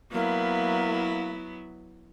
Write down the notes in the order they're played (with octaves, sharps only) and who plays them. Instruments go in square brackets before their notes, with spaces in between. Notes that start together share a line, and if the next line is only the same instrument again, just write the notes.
[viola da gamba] F#3 B3 E4 [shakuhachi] A#3